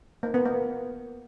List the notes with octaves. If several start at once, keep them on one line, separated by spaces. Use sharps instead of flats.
A#3
B3
A#3